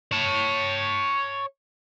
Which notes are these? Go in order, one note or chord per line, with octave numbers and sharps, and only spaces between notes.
C#5 A5